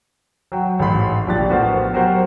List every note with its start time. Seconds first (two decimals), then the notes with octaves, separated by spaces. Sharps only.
0.52 F#3 F#4 G5
0.79 A1 G#2 B5 C6
1.27 A#1 A#2 D4 G4 F#6 A6
1.48 A#1 A2 B3 F#4 A#4 C5
1.93 F#3 F#4 G4 A#4 C5